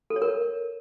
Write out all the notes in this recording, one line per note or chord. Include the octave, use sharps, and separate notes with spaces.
A4
C#5
A#4